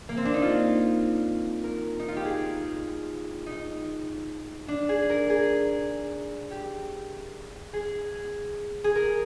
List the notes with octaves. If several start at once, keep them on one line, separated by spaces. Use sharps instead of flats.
A#3
C4
D4
D#4
F4
A#4
D#4
F4
G4
G#4
D#4
D4
G#4
A#4
G#4
G4
G#4
G#4
A#4